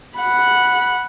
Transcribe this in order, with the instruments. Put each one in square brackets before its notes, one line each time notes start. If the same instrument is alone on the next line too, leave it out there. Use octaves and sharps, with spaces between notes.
[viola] F#5 B5